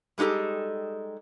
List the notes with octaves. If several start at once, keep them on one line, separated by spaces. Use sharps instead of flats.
G3 G#3 D#4 G4 A4